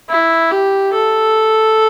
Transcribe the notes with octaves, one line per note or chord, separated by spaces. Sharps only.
E4
G4
A4